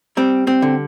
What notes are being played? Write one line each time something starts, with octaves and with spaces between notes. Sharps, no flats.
G3 C4
C4
D3